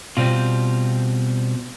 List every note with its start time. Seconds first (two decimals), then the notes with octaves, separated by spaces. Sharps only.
0.17 B2 G3 C4 F4